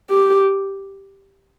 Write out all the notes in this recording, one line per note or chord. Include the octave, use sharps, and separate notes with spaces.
G4